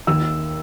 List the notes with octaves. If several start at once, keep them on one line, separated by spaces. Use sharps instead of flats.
D#2 E6